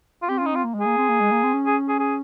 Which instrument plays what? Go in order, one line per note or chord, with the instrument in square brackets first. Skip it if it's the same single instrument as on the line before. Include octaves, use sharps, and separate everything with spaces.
[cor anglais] F4
[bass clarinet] C4 [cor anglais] G4
[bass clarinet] C#4 [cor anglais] F4
[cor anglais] D#4
[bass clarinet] C4 [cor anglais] F4
[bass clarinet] A#3
G#3
[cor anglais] G#4
[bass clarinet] A#3
C4
A#3
G#3
A#3
C4
C#4
[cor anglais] G#4
G#4
G#4